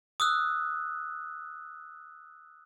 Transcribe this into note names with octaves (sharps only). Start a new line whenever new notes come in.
D#6 E6 F#6